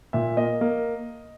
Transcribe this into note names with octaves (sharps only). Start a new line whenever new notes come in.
A#2 E5
A#3 D#5
A#3